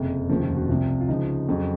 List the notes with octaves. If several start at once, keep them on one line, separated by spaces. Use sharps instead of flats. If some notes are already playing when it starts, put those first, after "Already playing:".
Already playing: F#1 F2 C3
F1 D#2 C#3 F3 A#3
F4
F#4
C2 C3 F3 F4
F4
C#2 C#3 F3 D#4
F2 C#3 F#3